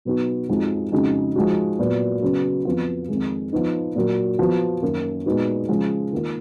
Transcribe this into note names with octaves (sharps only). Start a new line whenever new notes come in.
B2 F#3 B3 D#4 F#4
F2 F3 G#3 D#4 F#4
F2 C#3 G#3 D#4 F#4
F3 G#3 D#4 F#4
A#2 F#3 B3
C#3 F#3 B3
F2 F3 B3 F4
F2 D#3 G#3
F3 B3 D#4
A#2 F#3 A#3
F3 B3 F#4
F#2 D#3 A#3
A#2 G#3 B3 D#4 F#4
C#3 F3 G#3
D#3 A#3 F4